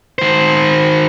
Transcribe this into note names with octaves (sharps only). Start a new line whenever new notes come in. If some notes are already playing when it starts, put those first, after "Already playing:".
D#3 C5